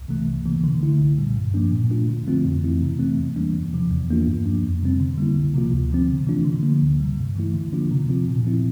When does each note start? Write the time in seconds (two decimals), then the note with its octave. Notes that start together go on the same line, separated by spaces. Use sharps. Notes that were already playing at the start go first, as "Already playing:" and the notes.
Already playing: C2
0.08 C3 E3 A3
0.27 C2
0.45 C3 E3 A#3
0.64 D3
0.81 A3 E4
0.99 C2
1.18 A#2 G3
1.36 G2
1.54 F3 A#3 D4
1.72 A#2
1.90 A3 D4 F4
2.09 D3
2.27 F3 A3 C4 F4
2.45 F2
2.63 E3 A3 C4 E4
2.82 C3
2.99 E3 A3 C4
3.18 E2
3.36 E3 G3 A#3 D4
3.54 E2
3.73 C3 F3
3.91 E2
4.08 E3 A#3 D4 F4
4.27 G2
4.46 F3 A#3 D4
4.63 F2
4.82 C3 G3 C4
5.00 D3
5.17 G3 A#3 E4
5.36 C2
5.54 C3 F3 A#3 F4
5.73 D2
5.91 D3 F3 C4
6.09 C3
6.27 E3 A3 D4 F4
6.45 D3
6.63 F3 A#3
6.82 D2
7.00 C3 G3
7.19 G2
7.36 E3 A3 E4
7.54 D3
7.73 F3 A#3 D4 F4
7.91 C3
8.08 F3 C4 F4
8.27 A#2
8.45 F3 C4 E4